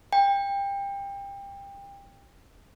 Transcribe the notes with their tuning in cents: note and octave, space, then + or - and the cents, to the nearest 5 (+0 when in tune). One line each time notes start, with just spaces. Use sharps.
G5 +25